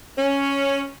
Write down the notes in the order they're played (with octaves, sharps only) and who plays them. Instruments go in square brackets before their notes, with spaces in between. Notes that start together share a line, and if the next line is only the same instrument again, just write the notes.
[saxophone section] C#4